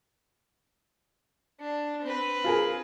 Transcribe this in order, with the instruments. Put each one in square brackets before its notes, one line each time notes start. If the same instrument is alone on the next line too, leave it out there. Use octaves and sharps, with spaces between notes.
[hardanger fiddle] D4
C4 B4
[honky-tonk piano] F4 G#4 A#4